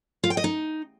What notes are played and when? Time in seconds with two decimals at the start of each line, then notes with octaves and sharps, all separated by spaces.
0.24 F4
0.30 G5
0.37 D#5
0.44 D#4